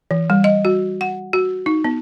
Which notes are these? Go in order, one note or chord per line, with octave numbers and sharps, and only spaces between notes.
E3
G3
D#5
F#4
F#5
F#4
D#4
B3